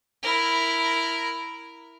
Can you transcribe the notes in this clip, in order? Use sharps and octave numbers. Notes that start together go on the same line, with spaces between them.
E4 A#4